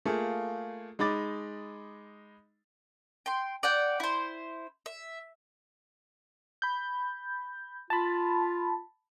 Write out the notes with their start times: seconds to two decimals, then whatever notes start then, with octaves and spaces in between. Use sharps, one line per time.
0.06 A3 A#3 F4 G#4
0.99 G#3 D#4 B5 D6 A6
3.26 G5 C6
3.63 D5 F#5 G5
4.00 E4 C5
4.86 E5
6.62 B5 G6
7.90 F4 A5 B5